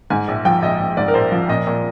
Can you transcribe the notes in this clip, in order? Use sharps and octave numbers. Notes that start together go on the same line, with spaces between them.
G#2 G#5
A#1
F3 G5
A#1 D#5
A#1
G#2 D5
A#4
A#1 C5
F3
A#2 D#5
A#2